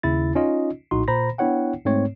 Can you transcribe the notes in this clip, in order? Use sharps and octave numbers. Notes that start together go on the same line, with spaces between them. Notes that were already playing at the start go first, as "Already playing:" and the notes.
D#2 C#3 E4 A6
C#4 D#4 F4 D#5
A#1 A2 D#4 F#4 C6
A#2 C5 A#5 B5 A#6
B3 D4 E4 C#5 F#5 G5
G#2 A3 C4 C#5